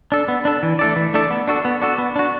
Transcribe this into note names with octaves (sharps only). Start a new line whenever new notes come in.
D4 A4
B3
D4 A4
E3
A3 D4 A4 D5
E3
A3 D4 A4 D5
B3
D4 F#4 A4
B3
D4 F#4 A4
B3
D4 F#4